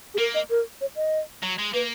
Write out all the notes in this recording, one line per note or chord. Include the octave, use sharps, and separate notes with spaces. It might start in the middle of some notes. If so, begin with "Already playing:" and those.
G#4
A#3 A#4
D#5
A#4
C#5
D#5
F#3
G#3
A#3 B4